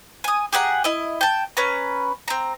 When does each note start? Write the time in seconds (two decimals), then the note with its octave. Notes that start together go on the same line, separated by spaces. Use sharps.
0.24 G#5 D#6
0.53 G4 G#4 F#5 A#5
0.84 E4 D#5
1.21 G5 A5
1.57 C#4 B4 A#5
2.28 C4 A#5